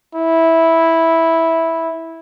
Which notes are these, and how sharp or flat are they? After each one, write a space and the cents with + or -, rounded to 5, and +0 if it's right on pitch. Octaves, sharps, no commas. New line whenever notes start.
E4 -10